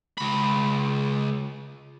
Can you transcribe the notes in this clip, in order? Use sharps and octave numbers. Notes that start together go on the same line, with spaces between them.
C#2 B5